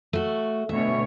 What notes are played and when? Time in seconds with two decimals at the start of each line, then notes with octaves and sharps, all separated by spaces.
0.13 A3 F#4
0.69 D2 B2 C#5 E5